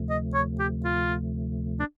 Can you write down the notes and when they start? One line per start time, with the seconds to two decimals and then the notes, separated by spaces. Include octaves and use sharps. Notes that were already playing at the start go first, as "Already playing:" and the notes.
Already playing: D2 C3 F3 A3
0.10 D#5
0.34 C#5
0.59 G4
0.84 F4
1.79 D4